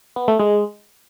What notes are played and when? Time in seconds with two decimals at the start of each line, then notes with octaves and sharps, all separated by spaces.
0.16 B3
0.28 A3
0.39 G#3